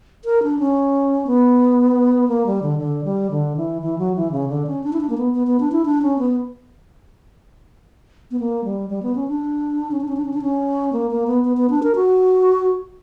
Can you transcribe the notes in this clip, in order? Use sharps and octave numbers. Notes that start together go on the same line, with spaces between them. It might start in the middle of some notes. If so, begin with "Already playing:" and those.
A#4
D4
C#4
B3
A#3
G3
D3
D3
G3
D3
E3
E3
F#3
E3
C#3
D3
C#4
D4
E4
D4
A#3
B3
B3
B3
D4
E4
D4
C#4
B3
B3
A#3
G3
G3
B3
C#4
D4
C#4
D4
C#4
D4
C#4
D4
C#4
A#3
A#3
B3
B3
B3
D4
A#4
F#4